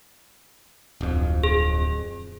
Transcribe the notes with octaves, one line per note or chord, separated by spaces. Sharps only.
D1 F2
G#4